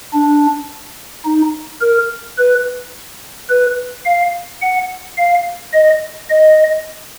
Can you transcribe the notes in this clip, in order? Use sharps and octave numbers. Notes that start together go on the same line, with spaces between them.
D4
D#4
A#4
B4
B4
F5
F#5
F5
D#5
D#5